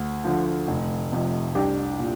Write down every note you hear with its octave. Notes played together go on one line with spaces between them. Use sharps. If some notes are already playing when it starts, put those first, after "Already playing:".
Already playing: D2
D3 F3
F1
F2 C3
C2 D4 G4
A#2